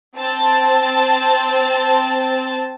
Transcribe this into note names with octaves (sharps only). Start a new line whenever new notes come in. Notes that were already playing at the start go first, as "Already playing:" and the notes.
C4 A5